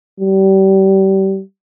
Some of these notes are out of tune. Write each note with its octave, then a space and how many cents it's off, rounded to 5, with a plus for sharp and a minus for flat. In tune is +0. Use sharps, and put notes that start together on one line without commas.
G3 -30